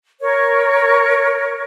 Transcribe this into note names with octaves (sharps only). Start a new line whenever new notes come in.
A#4 C#5